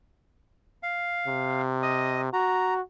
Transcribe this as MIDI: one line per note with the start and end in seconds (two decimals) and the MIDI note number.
0.83 1.62 77
1.27 2.30 48
1.83 2.21 75
1.83 2.21 87
2.33 2.81 66
2.33 2.74 82